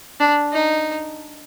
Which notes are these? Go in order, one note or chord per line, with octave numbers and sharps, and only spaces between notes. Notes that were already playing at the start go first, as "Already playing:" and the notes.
D4
D#4